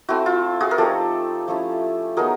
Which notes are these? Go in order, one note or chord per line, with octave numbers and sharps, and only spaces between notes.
A3 C4 E4 F#4
F4
F#4 G#4
A#4
F3 A3 C4 D#4 G4 A4
F3 A3 C#4 E4
F#3 B3 D#4 G#4 A#4